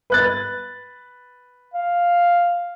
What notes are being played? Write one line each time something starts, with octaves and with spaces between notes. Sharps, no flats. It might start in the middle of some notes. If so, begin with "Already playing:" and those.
B4 F#6 A6
F5